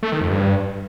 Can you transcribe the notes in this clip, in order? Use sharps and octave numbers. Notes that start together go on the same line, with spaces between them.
A3
D#3
F2
G2